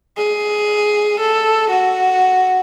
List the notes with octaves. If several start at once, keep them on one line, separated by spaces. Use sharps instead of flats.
G#4
A4
F#4